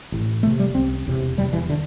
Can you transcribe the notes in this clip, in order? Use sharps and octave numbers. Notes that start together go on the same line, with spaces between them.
A1 A2
E1 E2 C3 A3
G3
C2 C3 C4
E1 E2 C3
E1 E2 C3 G3
E3
D3